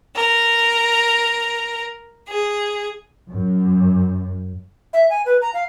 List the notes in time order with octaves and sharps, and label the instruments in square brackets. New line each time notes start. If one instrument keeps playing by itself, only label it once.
[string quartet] A#4
G#4
[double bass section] F#2
[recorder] E5
G#5
B4
A#5
F5